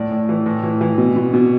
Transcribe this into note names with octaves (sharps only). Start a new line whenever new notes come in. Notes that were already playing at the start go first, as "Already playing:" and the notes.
Already playing: A2 D5
A2
E3
A2
E3
E3
B2
B2
B2